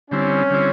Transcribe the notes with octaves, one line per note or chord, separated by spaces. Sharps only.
D3 G3 C4 C#4 E4
D3 G3 C4 E4